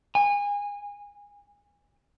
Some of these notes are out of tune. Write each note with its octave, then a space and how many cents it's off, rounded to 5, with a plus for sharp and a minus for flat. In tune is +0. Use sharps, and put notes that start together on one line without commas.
G#5 -25